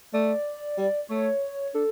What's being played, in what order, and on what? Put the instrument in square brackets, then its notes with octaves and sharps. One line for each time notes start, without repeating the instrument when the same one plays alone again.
[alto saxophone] A3 [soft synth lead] D5
[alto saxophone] G3
[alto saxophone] A3 [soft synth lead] C#5
[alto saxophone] D4 [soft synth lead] A4